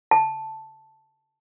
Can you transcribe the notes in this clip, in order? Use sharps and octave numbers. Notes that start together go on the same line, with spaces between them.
A5